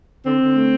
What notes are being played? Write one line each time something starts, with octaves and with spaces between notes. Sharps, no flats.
D3 C4
D3
A3